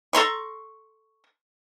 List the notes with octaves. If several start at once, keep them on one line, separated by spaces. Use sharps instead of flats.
A4 A#5 C6 C#6